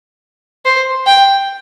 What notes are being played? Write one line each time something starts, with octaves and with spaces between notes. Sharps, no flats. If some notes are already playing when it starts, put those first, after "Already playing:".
C5
G5